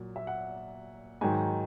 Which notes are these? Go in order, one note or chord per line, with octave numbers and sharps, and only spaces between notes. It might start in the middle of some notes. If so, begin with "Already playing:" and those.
Already playing: A#2 F#3
E5
F#5
G#2 D#3 F#3 G#5